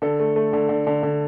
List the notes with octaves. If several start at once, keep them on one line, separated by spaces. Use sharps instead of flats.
D3 A4
A3
A3
D3
D3
D3
D3